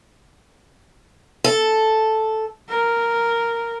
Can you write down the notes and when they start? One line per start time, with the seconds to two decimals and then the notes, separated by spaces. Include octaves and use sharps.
1.44 A4
2.69 A#4